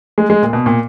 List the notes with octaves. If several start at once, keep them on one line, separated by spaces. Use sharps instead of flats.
G#3
G#3
A#2
B2
A#2